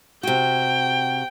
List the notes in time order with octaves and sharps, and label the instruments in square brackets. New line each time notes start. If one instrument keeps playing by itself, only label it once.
[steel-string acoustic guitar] C3 F#4 [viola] G5